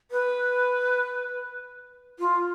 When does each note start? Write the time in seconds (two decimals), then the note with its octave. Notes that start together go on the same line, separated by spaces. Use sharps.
0.11 B4
2.19 F4